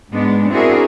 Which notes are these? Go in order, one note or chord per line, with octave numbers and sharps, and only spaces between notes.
G#2 G#3 B3 D4
C4 D4 E4 F#4 G#4 A#4